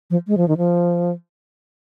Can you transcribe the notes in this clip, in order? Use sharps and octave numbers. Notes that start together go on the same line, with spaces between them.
F3
G#3
F3
D#3
F3